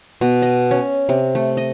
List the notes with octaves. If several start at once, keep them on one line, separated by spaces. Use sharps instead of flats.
B2
D#5
C#4
C3
A3
D#5